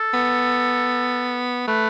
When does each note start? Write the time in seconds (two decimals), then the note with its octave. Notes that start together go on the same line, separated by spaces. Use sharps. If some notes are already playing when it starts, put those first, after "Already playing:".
Already playing: A4
0.14 B3
1.68 A3 B4